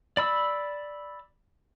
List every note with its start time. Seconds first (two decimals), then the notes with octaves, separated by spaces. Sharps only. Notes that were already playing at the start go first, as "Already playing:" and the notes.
0.17 D5 B5 E6